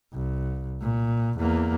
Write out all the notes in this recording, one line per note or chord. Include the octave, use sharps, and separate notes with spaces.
C2
A#2
E2 A#3